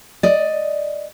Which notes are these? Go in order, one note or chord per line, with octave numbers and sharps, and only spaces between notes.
D5 D#5